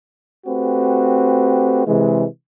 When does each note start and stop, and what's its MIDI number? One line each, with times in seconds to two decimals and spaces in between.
0.46 1.86 57
0.46 1.86 60
0.46 1.86 66
0.46 1.86 67
0.46 1.86 71
1.86 2.25 48
1.86 2.25 52
1.86 2.25 56